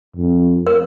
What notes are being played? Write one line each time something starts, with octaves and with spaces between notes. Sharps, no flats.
F2
A#4